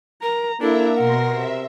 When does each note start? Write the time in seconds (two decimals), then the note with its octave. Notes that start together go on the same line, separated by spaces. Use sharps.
0.22 A#4 A#5
0.61 A#3 D4 E4 A4 E5 A#5
0.96 B2 A#4 F#5 C6 A#6
1.31 C3 E5